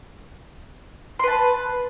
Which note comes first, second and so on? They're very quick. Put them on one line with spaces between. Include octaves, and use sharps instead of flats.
C6 B4 A5